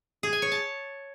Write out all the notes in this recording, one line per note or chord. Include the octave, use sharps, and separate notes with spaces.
G#4
G#5
C#5
A5